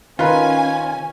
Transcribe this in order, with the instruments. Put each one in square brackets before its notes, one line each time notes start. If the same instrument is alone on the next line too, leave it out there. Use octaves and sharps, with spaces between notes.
[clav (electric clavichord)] D#3 A#4 B4 [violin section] C#4 G#5 [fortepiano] F4